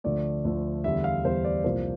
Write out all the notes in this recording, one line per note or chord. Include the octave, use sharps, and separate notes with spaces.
D2 D3 F3 A3 D5
D2 D3 F3 A3
E2 D3 G3 E5
F5
E2 D3 G3 C5
D5
C2 A#2 F3 A#3 C5